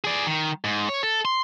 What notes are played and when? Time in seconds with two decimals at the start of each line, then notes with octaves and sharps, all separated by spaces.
0.04 G#4 D5
0.26 D#3
0.64 G#2
0.89 C#5
1.03 A4
1.25 C6